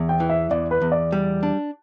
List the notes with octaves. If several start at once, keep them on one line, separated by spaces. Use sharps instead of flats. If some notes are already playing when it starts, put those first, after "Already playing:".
Already playing: E2
G5
E3
E5
E2 D5
B4
E2
D5
G3
D4